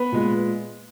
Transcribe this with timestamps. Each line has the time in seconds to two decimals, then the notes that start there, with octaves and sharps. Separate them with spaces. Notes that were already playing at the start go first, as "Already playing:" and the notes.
Already playing: B3 B4
0.12 A#2 G#3